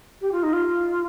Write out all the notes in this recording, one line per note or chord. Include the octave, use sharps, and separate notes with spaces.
G4
F4
D#4
F4